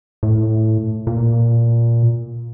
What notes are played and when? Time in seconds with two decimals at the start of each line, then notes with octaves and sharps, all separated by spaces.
0.23 A2
1.07 A#2